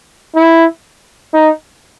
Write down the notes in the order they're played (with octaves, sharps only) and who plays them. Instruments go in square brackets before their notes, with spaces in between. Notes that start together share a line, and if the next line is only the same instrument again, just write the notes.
[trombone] E4
D#4